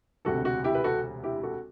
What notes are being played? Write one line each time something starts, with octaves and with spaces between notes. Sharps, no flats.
E1 D2 C3 F#4 A4
F#4
E4 G4
B4
F#4 A4
E4 G4
F#4 A4